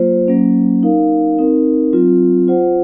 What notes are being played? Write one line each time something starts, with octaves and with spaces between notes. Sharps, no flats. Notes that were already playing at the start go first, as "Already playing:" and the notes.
Already playing: F#3 A#3 F4 C5
F#3 A#3 C#4
D#4 A#4 F5
C4 D#4 A#4
F#3 C4 F4
F4 C5 F#5